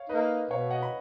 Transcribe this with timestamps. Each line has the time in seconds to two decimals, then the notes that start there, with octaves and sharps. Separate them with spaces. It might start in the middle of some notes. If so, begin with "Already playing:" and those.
Already playing: C#5 F5
0.09 A#3 D#4 B4 D#5
0.50 B2 C#5 F5
0.71 D#5 F#5
0.82 B5